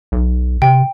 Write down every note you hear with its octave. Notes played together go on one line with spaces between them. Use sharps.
B1
C3 G5